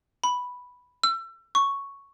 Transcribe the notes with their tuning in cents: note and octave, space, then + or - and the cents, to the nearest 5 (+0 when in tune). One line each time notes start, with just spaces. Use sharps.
B5 +0
E6 +35
C#6 +0